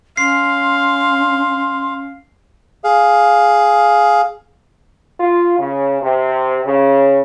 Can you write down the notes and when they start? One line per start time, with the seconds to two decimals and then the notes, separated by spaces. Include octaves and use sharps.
0.17 C#4 F5 C6 C7
2.84 G#4 F5
5.19 F4
5.57 C#3
6.01 C3
6.65 C#3